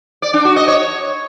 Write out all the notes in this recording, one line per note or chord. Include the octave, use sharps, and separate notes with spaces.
D5
D4
F#4
D#5
C#5